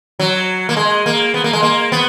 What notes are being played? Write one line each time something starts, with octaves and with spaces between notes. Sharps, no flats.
F#3
A#3
G#3
A#3
B3
A#3
G#3
A#3
B3